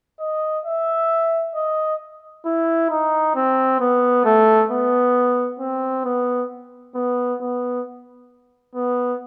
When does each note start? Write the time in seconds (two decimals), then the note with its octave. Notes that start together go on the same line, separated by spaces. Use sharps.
0.20 D#5
0.66 E5
1.55 D#5
2.45 E4
2.90 D#4
3.35 C4
3.80 B3
4.25 A3
4.71 B3
5.60 C4
6.05 B3
6.95 B3
7.41 B3
8.75 B3